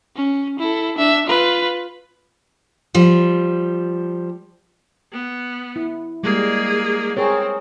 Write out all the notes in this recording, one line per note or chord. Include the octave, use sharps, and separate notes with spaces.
C#4
E4 A4
D4 E5
F4 B4
F3 G3
B3
E4
G3 G#3 A#3 G#4
C4 G#4 A#4 C#5